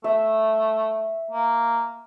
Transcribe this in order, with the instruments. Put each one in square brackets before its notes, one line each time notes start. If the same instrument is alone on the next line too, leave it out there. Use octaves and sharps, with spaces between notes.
[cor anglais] A3 [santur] E5
[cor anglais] A#3